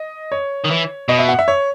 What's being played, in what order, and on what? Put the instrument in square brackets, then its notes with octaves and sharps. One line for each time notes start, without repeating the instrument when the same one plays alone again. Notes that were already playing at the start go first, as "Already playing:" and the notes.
Already playing: [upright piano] D#5
C#5
[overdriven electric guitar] D#3
E3
[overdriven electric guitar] B2 [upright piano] D#5
[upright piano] E5
F#5
E5
C#5